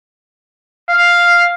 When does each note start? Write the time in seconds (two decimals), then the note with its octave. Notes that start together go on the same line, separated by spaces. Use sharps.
0.90 F5